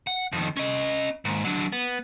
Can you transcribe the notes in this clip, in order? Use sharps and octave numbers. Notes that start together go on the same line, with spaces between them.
F#5
F2 D#3
C#4 D#5
D#2 G#2
F#3 D4
B3